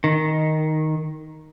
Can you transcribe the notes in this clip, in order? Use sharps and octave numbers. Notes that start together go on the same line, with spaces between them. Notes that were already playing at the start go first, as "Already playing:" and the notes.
D#3